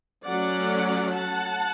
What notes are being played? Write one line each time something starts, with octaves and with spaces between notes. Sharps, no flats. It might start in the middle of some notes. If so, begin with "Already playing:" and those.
F#3 A3 C#4 D5 F#5
F#5 A5